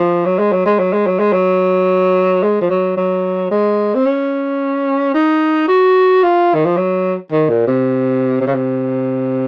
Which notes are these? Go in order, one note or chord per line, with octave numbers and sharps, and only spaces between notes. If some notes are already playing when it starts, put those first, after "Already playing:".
Already playing: F3
F#3
G#3
F#3
G#3
F#3
G#3
F#3
G#3
F#3
G#3
F3
F#3
F#3
G#3
C4
C#4
D#4
F#4
F4
D#3
F3
F#3
D#3
A#2
C3
C3
C#3
C3